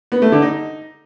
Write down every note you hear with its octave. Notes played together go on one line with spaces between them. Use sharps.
B3
A3
D3
D#4